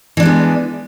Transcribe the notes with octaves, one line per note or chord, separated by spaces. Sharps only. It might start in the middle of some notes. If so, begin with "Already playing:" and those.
E3 G#3 B3 D4